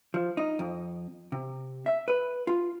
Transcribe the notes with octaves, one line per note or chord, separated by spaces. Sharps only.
F3
D#4
F2
C3
E5
B4
F4